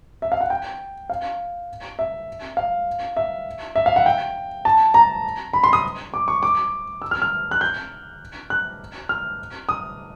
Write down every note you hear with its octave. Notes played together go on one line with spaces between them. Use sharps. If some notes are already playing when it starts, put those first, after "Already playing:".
E5
F5
F#5
G5
F5
E5
F5
E5
E5
F5
F#5
G5
A5
A#5
B5
C6
D#6
D6
C#6
D6
E6
F6
F6
F#6
G6
F#6
F6
D#6